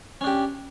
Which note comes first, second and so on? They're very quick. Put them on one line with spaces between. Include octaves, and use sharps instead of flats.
C#4 D4 G4